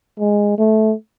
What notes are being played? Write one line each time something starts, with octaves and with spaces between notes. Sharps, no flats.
G#3
A3